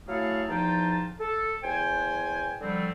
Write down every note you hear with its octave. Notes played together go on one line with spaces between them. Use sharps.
F#3 A3 E4 G#4 A4 F5
E2 F3 D#4 F4 G5 A5
A4
E2 C5 G5 G#5
D3 F3 G3 A3 C4